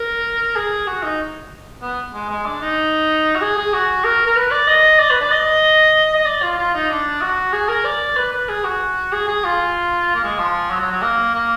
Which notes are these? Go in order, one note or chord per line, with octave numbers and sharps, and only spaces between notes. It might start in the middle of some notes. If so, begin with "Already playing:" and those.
Already playing: A#4
G#4
F#4
D#4
B3
G#3
G#3
D4
D#4
F#4
G#4
G#4
F#4
A#4
A#4
B4
D5
D#5
D5
B4
D5
D#5
D#5
D5
F4
F4
D#4
D4
F#4
G#4
A#4
D5
B4
B4
G#4
F#4
G#4
G#4
F4
A#3
G#3
F3
F#3
F#3
F#3
A#3
A#3